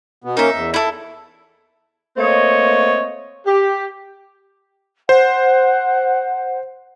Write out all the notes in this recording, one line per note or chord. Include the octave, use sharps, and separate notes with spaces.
B2 B3
A#3 C#4 D#4 A#4 E5
E2
E4 A4
A3 A#3 C4 C#5 D#5
G4
C5 F#5